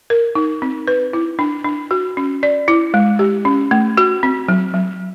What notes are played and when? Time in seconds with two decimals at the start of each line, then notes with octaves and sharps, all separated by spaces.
0.10 A#4
0.35 D#4
0.62 C4
0.88 B4
1.13 E4
1.39 D4
1.64 D4
1.91 F#4
2.17 C#4
2.43 D5
2.68 E4
2.94 G#3
3.19 G4
3.45 C#4
3.71 A3
3.97 F#4
4.23 C4
4.48 F#3
4.74 F#3